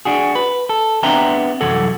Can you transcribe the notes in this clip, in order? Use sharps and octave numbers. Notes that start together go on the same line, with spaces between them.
D4 F#4 G#4
B4
A4
B3 C4 D4 E5 G5 A#5
C2 F#2 E3 F#3 F#4 A4